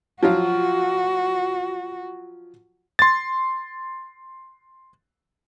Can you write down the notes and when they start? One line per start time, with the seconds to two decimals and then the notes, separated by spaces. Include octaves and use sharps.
0.23 F3 F#3 F4 F#4
2.99 C6 A6